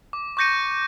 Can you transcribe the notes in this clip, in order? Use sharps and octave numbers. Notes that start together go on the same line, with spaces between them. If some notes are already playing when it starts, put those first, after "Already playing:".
D6
C#6 D6 G6 A#6 C#7 D#7